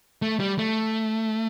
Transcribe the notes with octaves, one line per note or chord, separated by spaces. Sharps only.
A3
G3
A3